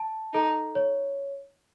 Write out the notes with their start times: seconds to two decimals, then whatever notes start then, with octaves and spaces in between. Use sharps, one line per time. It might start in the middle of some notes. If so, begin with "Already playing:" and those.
Already playing: A5
0.33 D#4 A4
0.75 C#5